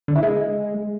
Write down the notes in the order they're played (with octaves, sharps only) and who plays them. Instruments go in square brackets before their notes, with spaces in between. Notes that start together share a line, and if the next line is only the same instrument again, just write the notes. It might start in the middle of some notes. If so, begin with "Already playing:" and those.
[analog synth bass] D3
E4
G#3